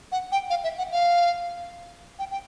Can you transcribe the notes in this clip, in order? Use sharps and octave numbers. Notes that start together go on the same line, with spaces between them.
F#5
G5
F5
E5
F#5
F5
G5
G5